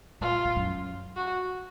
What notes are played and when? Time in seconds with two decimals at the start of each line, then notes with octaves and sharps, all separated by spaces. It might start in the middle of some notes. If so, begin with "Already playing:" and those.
0.21 A#2 F4
0.45 A#2
0.56 F#2
1.16 F#4